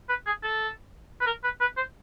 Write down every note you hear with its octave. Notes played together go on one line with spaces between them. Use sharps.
B4
G#4
A4
B4
A#4
B4
B4
C5